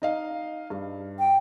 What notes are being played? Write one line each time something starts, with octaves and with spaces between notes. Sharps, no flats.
D#4 D#5 F5
G2
G5